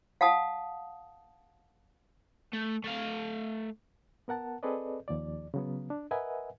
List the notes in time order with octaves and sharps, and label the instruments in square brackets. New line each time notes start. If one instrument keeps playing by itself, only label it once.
[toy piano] F5 F#5 A5 D#6
[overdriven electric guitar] A3
A3 F5
[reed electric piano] B3 A#4 F#5 A5
C4 G#4 A4 B4 D5 D#5
D#2 F3 D5
C#3 F#3 B3
D4
A#4 B4 D#5 E5 F#5 G#5